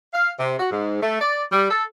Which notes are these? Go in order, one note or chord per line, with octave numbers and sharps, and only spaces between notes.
F5
C3
F#4
G#2
A3
D5
G3
A4